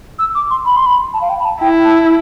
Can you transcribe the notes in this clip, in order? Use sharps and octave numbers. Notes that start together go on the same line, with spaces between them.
E6
D6
C6
B5
C6
B5
A5
F5
G5
B5
A5
E4 G5
A5